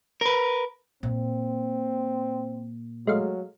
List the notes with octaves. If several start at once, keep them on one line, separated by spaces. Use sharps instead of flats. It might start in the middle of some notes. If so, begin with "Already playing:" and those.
A#4 B4
A#2 C4
F#3 G#3 A3 F5